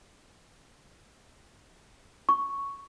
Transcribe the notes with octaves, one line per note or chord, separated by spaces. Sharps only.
C#6